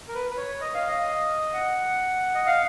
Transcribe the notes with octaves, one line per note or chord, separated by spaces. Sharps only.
A#4
B4
B4
C#5
D#5
F5
D#5
F#5
D#5
F5